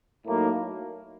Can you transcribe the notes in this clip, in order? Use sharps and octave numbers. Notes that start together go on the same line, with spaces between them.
A2 F#3 A#3 D#4